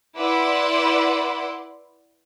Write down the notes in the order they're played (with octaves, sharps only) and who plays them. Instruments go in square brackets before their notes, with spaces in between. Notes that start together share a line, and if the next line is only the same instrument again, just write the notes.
[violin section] E4 B4 D5 F#5 C6 D6